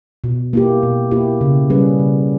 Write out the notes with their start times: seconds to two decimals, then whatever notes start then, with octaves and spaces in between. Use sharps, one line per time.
0.24 B2
0.53 A#3 E4 G4
0.83 B2
1.11 A#3 E4 G4
1.41 C#3
1.70 G3 C#4 G#4 B4
1.99 C#3